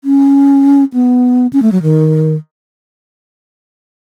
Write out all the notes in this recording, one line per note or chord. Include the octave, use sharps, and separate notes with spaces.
C#4
B3
C#4
A3
F#3
D#3